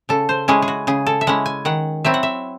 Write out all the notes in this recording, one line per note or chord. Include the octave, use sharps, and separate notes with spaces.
C#3 A4
C5
G#3 C#4 E4 G#4
G#4
F#4
C#3 G#4
A4
E5
G#3 C#4 E4 F#5
G#5
D#3 F#5
F#3 C4 E4 E5
F#5
E5